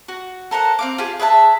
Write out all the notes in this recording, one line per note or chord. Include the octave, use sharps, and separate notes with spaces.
F#4
A4 A#4 C5 F#5
C4 F5 D6
F4 G4 G#4
G#4 B4 E5 A5